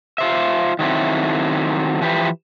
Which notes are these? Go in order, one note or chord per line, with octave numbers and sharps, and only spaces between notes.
F4 C5 E5
D#3 F#3 A3 C4 E4
E3 F3 G4 B4